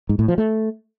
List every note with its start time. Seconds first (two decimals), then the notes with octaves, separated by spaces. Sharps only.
0.09 G#2
0.19 A2
0.28 F3
0.38 A3